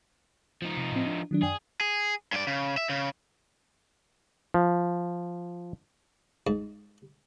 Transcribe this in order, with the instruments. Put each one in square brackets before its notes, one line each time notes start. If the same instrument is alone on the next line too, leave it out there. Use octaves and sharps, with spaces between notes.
[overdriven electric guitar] F3 D#4
[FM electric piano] C3
A2 C4
D4
D#3 F#3 D4
[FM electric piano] F#2 D5 G5 [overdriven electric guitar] G#4
[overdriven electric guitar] G#4
G2 D5
C#3
E5
C#3
[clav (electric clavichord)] F3
[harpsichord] G#2